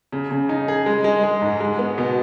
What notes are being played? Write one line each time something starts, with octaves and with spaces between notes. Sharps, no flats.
C#3
C#3
D#4
G#4
G#3
G#3
G#3
G#2
G#3
B3
B2